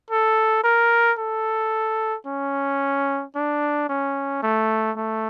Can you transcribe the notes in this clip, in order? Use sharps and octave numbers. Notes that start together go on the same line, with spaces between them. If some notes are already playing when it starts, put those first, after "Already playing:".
A4
A#4
A4
C#4
D4
C#4
A3
A3